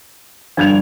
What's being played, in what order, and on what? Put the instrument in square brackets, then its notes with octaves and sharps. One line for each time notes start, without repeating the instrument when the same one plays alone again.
[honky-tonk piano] G1 G#6 F7 [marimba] F3 D5 [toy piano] D4